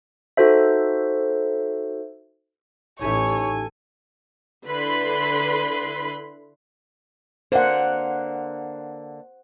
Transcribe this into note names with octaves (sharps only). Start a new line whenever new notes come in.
D#4 F#4 A4 C5 E5
A1 D#4 G4 A4 C#5 E5 G#5
D3 E4 B4 B5 C6
D3 A#3 C5 F#5